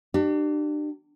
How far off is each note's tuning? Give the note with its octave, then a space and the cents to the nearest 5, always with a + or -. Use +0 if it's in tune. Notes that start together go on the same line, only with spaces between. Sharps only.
D4 +35 G4 -25